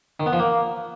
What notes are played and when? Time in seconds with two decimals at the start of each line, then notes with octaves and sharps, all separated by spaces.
0.20 D#3
0.26 B3
0.33 F3
0.39 A#3